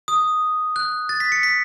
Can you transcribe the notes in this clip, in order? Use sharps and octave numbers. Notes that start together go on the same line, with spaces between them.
D#6
F#6
A6
B6
C#7
B6